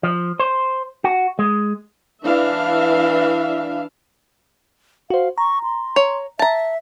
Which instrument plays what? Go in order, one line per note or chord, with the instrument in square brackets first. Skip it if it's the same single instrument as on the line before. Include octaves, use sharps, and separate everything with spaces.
[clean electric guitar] F3
C5
F#4
G#3
[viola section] E3 D4 E5 F5
[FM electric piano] F#4 C5 [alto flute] F5
[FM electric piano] A#5 [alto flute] C#6
[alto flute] C6
[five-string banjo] C#5
[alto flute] E5 [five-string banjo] A5 A#5